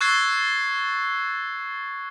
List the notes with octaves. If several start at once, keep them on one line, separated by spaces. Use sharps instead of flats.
C#6 E6 F#6 G#6 A6 C7